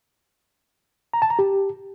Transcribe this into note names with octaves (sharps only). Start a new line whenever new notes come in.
A#5
A5
A#5
G4